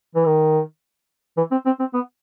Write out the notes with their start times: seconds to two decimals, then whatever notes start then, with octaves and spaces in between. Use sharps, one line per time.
0.15 E3
0.26 D#3
1.37 E3
1.51 C4
1.66 C4
1.80 C4
1.94 B3